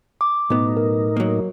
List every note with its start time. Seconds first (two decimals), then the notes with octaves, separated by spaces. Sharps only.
0.21 D6
0.50 B1 A2 B3 D#4
0.77 A#4
1.17 F#3 A#3